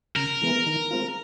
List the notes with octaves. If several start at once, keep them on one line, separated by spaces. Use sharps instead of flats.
C#3 A#4
E3 G#3 B3
D#3
G#3 C4 F4